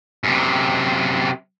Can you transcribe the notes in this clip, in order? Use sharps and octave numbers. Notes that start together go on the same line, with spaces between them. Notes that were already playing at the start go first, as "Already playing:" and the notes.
F#2 C3